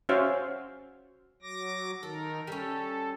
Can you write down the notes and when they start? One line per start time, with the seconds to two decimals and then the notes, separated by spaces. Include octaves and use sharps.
0.09 C#4 F#4 C5 E5 F5
1.42 F#3 D6 A#6
2.03 D#3 A4 A#4
2.47 G3 C#4 A4